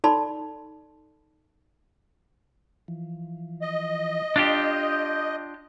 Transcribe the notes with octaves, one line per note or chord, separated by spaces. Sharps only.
D#4 A4 D5 A5 B5 C6
E3 F3
D#5
D4 F4 G4 D#6 G6